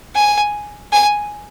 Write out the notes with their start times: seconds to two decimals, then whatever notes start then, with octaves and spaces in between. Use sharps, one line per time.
0.15 G#5
0.93 G#5